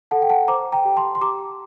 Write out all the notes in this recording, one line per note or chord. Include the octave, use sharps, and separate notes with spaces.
A4 F#5 A5
G5
F#5 A5
C5 A#5 D6
G5 A#5
G4
A5 C6
C6
G4 A#5 D6